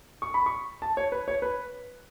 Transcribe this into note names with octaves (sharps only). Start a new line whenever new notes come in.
C#6
B5
C#6
A5
C#5
B4
C#5
B4